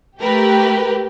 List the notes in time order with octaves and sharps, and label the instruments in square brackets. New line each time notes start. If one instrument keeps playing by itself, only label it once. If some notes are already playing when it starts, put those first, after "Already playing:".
[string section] A3 A#4 B4 [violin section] G4